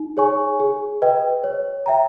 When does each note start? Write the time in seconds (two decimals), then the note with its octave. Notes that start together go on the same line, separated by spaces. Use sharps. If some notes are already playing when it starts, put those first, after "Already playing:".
Already playing: D#4
0.17 G#4 C#5 G#5 C#6
0.60 G#4
1.02 B4 D#5 G5
1.44 C#5
1.86 E5 G5 A#5